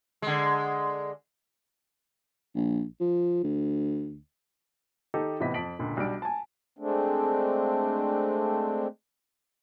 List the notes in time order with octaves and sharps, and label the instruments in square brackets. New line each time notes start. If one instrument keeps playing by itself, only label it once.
[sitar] D3 G#3
[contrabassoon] A#1
F3
D2
[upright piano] D#3 D#4 G4 A4
A2 C3 E3 B3 D#5 B6
F2 A5 B6 D7 F#7
C#2 A#2 D3
B1 G3 D4 D7
G#5 A5
[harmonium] G#3 A3 C4 D4